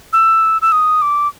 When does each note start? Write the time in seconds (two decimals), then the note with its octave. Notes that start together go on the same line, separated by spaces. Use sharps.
0.13 E6
0.62 E6
0.72 D#6
1.02 D6